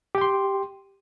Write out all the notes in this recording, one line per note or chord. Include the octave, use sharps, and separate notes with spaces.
G4 G5 C6